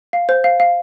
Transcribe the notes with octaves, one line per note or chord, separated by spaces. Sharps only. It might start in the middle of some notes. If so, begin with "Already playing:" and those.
F5
C5
F5
F5